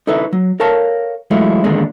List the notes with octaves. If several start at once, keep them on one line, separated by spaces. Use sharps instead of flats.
D#4 E4 A4 B4 E5
F#3
A4 A#4 C#5 F5 A5
E3 F#3 G#3 A3 E4 F4
E2 A#2 D3 D#3 G#3 D4